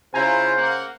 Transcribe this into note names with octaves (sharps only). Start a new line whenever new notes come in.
C#3 E4 F4 C5 G#5 A#5
A#3 F#5